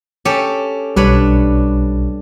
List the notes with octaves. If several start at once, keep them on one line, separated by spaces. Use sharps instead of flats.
C#4 G4 A4
B1 G3 D4 B4 C#5